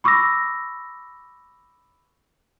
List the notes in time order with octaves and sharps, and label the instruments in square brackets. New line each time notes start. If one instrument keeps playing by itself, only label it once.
[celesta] B5 C#6 D6 E6 A#6